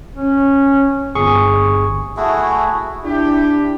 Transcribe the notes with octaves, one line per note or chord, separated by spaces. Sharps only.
C#4
G1 G#4 C#6
A3 E4 F#4 G#4
D4 E4 G4